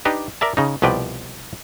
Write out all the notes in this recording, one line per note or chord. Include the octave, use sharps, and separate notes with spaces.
D4 D#4 G4 B4
A#4 D5 E5 A5
C#3 D#4
C2 B2 F3 B4 D5 G5